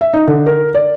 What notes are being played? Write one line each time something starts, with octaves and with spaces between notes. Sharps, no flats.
E5
D#4
D3
A#4
D5